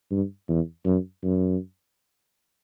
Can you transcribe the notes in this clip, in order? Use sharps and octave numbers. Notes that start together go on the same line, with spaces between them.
G2
E2
F#2
F#2